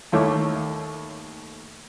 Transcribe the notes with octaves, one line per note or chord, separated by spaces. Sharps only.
D#2 D#3 A3 C#5 E5 D6